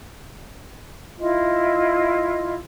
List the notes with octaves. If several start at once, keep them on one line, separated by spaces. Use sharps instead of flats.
E4 F4 D#5